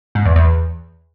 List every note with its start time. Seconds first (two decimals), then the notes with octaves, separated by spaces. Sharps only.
0.15 G#2
0.25 E2
0.36 E2